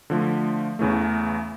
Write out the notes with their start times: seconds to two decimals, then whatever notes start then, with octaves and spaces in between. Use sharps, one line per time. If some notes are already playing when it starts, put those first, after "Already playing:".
0.10 D3 F3 A3
0.79 E2 C#3 E3 A3